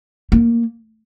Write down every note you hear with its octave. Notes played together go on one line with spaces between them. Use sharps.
A#3